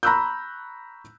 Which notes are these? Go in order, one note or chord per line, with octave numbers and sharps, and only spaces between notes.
A#5 B5 C#6 E6 F#6 G6